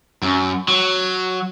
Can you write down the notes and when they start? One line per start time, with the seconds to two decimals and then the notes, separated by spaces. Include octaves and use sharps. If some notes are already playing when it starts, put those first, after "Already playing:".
0.22 F#2
0.68 F#3